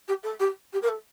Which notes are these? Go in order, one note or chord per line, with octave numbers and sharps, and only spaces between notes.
G4
A4
G4
G4
A#4
A4